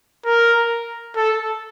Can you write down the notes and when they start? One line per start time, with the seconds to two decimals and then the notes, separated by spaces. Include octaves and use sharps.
0.26 A#4
1.16 A4